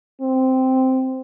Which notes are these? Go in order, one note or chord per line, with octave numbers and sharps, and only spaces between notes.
C4